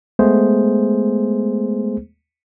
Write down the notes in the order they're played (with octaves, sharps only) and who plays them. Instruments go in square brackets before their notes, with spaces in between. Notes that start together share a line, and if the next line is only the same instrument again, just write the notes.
[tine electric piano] G#3 A3 B3 G#4 C5